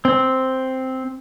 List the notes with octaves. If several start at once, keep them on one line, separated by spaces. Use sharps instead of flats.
C4